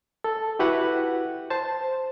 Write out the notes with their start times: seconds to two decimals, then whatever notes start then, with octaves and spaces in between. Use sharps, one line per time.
0.24 A4
0.59 E4 F#4 G4 B4 F#5
1.50 C5 A5